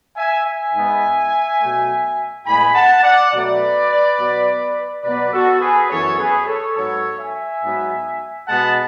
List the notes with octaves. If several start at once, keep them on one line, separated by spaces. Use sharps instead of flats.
E5 G#5
E5 G#5
G#2 G#3 B3
B2 F#3 A3
A2 G#3 B3 G#5 B5
F#5 A5
D5 F#5
B2 F#3 A3 B4 D5
B2 F#3 B3
B2 F#3 B3 B4 D5
F#4 A4
G#4 B4
F#2 E3 B3 A4 C#5
G#4 B4
A4 C#5
G#2 F#3 B3 A4 C#5
E5 G#5
G#2 F#3 B3
B2 G#3 B3 F#5 A5